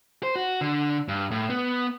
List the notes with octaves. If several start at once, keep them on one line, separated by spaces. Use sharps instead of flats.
C5
F#4
D3
G2
A2
B3